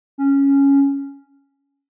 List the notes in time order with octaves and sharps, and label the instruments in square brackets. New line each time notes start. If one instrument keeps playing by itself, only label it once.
[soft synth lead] C#4